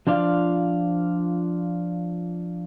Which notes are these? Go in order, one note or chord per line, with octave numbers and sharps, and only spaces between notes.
F3 D4 F4 D5 F5